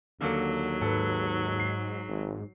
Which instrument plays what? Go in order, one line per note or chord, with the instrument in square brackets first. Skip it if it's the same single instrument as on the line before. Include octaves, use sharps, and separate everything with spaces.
[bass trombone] D#2 [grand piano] D3 A#3 A4 [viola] F#3
[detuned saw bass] G#2 [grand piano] A4 B4
[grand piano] C7
[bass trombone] G#1